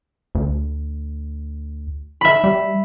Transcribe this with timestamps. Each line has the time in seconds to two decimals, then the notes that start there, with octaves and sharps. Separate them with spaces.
0.35 D2
2.21 E5 B5
2.44 G3